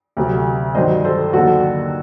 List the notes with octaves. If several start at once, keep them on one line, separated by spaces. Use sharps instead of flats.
D2 C3 F#3
G2 D#3 F#3 C5 D#5
A4 C5
D#2 D3 F#3 F#4 A4